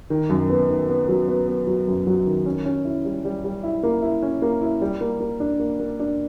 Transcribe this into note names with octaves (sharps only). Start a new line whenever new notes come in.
D#3
F#2
B3
D#3
B3
F#3
B3
B3
F#3
F#2
F#3
D#3
C#4
C#4
E4
G3
G3
G3
E4
A#3
E4
C#4
A#3
E4
G3
A#3
A#3
D4
A#3
A#3
D4